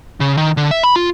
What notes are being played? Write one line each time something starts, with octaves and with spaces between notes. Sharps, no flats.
C#3
D#3
D3
E5
B5
F4